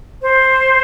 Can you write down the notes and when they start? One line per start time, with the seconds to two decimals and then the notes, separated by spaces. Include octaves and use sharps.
0.22 C5